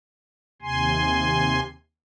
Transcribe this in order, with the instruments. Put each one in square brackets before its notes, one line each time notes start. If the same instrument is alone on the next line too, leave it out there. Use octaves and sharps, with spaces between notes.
[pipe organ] D#2 C3 G#5 C6